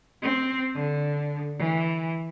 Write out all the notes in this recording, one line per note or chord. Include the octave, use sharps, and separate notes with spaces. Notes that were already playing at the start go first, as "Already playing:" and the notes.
C4
D3
E3